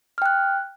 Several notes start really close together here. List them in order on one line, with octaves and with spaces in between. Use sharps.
F6 G5 F#6